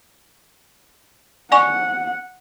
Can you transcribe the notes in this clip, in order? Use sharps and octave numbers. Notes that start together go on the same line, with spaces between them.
D5 F#5 G#5 C#6